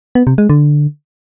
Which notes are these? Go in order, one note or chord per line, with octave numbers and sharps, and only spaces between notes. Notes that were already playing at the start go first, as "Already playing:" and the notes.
B3
C3
G#3
D3